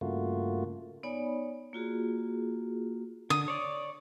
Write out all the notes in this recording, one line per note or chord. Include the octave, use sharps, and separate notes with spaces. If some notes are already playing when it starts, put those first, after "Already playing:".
G2 C#3 A3 A#3 F4 F#4
B3 D#4 C#5 D5 G#5 B5
A#3 F4 F#4 G#4
D3 D#6
C#5 D5